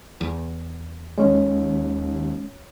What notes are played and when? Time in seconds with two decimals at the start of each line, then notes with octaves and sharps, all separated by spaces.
0.21 E2
1.18 D#2 G#3 C#4 C#5